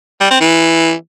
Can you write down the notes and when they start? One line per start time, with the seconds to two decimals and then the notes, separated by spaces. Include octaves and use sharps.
0.21 G3
0.31 C4
0.41 E3